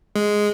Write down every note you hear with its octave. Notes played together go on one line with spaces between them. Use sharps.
G#3